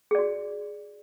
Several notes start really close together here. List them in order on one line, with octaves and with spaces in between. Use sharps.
G#4 D5 F#4